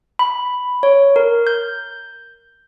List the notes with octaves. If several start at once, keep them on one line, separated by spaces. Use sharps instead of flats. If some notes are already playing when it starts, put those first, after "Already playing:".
B5
C#5
A#4
G6